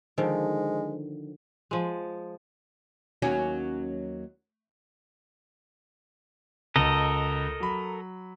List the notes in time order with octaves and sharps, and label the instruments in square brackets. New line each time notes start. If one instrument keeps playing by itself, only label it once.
[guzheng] D3 D#3 F3 [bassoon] G#3
[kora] F3 G#3
[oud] D#2 F#3 C#4
[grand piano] C#2 [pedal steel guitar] A4 A#4 D#5
[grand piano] F#3 B5